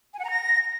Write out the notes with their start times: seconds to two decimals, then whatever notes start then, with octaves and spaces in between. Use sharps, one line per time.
0.14 G#5
0.19 F#5
0.25 A#5
0.30 A#6